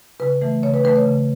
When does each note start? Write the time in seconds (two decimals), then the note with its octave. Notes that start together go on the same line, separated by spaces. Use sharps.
0.20 C#3 B4
0.42 E3 A3
0.62 C#3 C#5
0.74 B4
0.84 E3 A3 B4
0.96 C#5
1.05 C#3